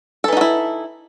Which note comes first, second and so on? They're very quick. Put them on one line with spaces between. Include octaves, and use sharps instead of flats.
A4 E3 D#4 F#4 E4